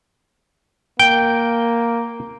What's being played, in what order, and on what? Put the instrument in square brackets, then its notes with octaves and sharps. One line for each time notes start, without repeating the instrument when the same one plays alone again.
[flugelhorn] A#3 [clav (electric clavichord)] G5